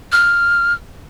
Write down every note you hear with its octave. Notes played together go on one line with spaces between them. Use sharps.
F6